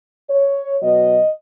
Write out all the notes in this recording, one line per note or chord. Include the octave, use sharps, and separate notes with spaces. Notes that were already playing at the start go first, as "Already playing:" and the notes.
C#5
B2 F#3 D#5